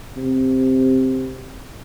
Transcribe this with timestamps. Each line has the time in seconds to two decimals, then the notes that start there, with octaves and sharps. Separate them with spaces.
0.17 C3